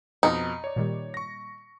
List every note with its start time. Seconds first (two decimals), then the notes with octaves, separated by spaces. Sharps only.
0.23 F2 B2 D#4 C#7
0.64 C#5 D5
0.76 A#2 D#3 G3
1.14 C#6 A#6